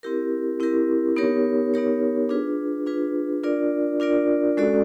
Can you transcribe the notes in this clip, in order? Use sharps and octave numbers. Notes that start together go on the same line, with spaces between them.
C4 E4 G4 A#4
C4 E4 G4 A#4
B3 D#4 G4 A#4 C#5
B3 D#4 G4 A#4 C#5
D4 F4 G#4 B4
D4 F4 G#4 B4
D4 F4 A#4 D5
D4 F4 A#4 D5
G#3 C#4 F#4 A4 D5